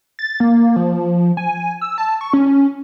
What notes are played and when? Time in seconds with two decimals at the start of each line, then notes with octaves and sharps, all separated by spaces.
0.19 A6
0.40 A#3
0.76 F3
1.37 G#5
1.81 E6
1.98 A5
2.21 C#6
2.33 C#4